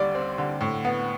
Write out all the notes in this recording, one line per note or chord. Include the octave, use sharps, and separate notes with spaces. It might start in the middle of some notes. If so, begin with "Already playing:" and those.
Already playing: D#2 D3 G3 D5
C4
D3
A2
B3